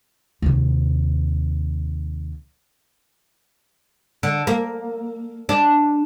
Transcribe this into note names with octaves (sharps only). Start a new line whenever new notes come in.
D#2 C3
D3
A#3
D4